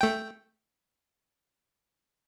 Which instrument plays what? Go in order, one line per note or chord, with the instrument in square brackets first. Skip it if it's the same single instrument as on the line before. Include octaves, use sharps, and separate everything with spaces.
[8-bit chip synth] A3 G5